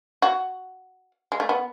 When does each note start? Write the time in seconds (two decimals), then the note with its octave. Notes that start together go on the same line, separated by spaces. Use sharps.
0.22 F#4
1.32 G#3
1.40 A3
1.49 B3